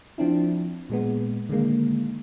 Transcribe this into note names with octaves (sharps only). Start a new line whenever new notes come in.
F3 C4 D4 E4
A#2 G#3 B3
D3 D#3 G#3 A#3